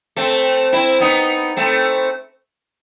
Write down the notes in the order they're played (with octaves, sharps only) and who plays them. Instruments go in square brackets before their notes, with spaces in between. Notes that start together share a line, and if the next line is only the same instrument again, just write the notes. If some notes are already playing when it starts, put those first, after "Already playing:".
[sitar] A3 C4
C4 E4
B3 D#4
A3 C4